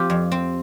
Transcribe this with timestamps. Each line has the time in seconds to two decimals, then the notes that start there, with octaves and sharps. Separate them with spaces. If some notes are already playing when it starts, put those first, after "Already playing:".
Already playing: F3 C4 F4 G4
0.10 F2
0.32 C4